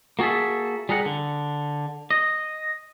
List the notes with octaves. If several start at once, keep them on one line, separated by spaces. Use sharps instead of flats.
A#3 F#4 G#4 A4 E5
G3 G#4 A#4 F#5
D3
D#5